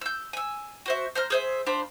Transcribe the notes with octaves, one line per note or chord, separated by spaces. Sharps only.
E6 G6
G#5 E6
F#4 C5 E5
C5 A#5 F6
G#4 C5 E5
D4 F4 C5 B5